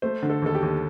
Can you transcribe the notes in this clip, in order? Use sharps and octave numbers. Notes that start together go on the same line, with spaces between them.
A3 C5
D3
A4
D#2 A4
G4
D#2